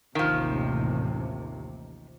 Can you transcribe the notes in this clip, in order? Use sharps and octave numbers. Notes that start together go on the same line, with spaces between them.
A1 D#2 C3 D#3 F3